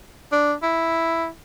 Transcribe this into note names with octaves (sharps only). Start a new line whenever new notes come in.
D4
E4